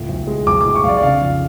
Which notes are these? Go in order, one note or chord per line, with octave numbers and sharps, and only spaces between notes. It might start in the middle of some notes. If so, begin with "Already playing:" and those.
Already playing: C#2 A2
B1
G#3
B1 D6
D6
A2
C#6
B1 D5 F5
D5
C#3 F5
F2